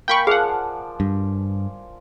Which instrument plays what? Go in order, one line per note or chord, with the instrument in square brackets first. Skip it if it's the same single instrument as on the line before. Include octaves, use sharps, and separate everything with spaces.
[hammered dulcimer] A#3 A#4 G#5 [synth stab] G5 B5 C#6
[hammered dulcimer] F3 D5 A5 [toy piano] G#4 [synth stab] F5 F#5
[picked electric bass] G2